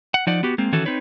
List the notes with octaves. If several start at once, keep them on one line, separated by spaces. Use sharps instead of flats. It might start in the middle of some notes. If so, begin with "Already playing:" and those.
F#5
F3 D#4 D5 F#5
B3 F#4 G4
G#3 A#3 C4
D#3 E3 C#4 F#4 A4
C4 D#4 B4 C#5